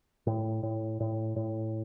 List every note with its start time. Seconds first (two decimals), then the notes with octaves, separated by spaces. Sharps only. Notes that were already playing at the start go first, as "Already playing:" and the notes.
0.27 A2
0.63 A2
1.00 A2
1.36 A2